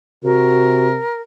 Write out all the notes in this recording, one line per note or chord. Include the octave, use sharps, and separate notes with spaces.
C3 F#4 A#4